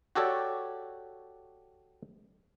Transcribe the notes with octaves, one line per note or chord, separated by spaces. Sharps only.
F#4 G4 A4 C#5 D5